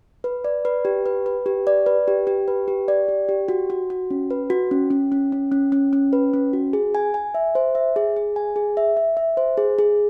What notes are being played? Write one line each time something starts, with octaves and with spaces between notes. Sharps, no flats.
B4
D5
B4
G4
B4
B4
G4
D5
B4
G4
G4
B4
G4
D5
G4
G4
F#4
F#4
F#4
C#4
B4
F#4
C#4
C#4
C#4
C#4
C#4
C#4
C#4
B4
C#4
F#4
G#4
G#5
G#5
E5
C5
E5
G#4
G#4
G#5
G#4
E5
E5
E5
C5
G#4
G#4